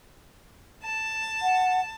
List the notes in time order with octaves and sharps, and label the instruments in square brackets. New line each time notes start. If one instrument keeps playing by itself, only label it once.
[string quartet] A5
[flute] F#5